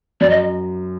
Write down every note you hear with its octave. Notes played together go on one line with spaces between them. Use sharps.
F#2 D5
D#5